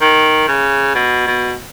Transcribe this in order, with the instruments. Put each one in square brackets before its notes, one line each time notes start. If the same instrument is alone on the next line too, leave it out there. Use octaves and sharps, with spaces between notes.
[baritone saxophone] D#3
C#3
B2
B2